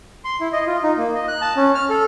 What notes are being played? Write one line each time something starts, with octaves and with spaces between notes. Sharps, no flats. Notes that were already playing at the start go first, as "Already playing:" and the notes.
C6
E4
D#5
F4
D#4
A#3
D#5
F#6
A5
C#4
F6
A4